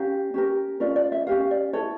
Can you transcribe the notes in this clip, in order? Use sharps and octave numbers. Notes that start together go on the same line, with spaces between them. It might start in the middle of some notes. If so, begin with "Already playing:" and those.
Already playing: C#4 G4 A#4 F5
C#4 G4 A#4
C#4 F4 A#4 D5
D5
E5
C#4 G4 A#4 F5
D5
E4 A4 C#5